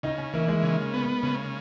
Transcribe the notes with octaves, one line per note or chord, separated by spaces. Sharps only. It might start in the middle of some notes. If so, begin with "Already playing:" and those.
C#3 D#4
C#4
E3 A#3
G#3
C#3
B3
C#3